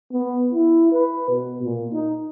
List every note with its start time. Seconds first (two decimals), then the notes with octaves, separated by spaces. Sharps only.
0.12 B3
0.52 E4
0.92 B4
1.30 B2
1.63 A#2
1.93 D#4